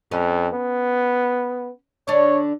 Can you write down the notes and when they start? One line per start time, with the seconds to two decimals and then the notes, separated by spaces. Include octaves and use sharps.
0.11 F2 C#4
0.53 B3
2.08 D3 D4 C#5 D5